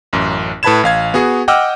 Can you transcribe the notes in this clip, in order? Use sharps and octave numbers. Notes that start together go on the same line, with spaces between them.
A1 F#2
A2 B4 A5 B5 G#6 E7
A1 F5 G#6
B3 F#4 G#4
D#5 F#5 G5 D6 E6 F6